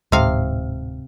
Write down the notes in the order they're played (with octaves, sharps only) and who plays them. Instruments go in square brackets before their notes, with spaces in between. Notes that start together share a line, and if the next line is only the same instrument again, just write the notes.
[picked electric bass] D1 G#2 [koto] C3 F5